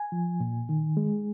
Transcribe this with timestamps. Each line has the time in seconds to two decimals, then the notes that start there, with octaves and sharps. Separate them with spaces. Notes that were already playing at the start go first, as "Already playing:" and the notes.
Already playing: G#5
0.12 F3
0.40 A#2
0.69 D#3
0.97 G#3